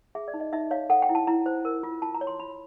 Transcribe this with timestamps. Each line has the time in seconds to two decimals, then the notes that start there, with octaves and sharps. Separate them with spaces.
0.15 G#4 E5
0.28 D5
0.34 D#4
0.40 D#5
0.53 D#4 E5
0.71 C#5 F5
0.90 A4 F#5
1.02 G5
1.09 E4
1.15 A5
1.27 E4 A#5
1.46 C5
1.65 A#4
1.83 F4
2.02 F4 A5
2.15 A#5
2.21 C#5
2.27 C6
2.40 F4 B5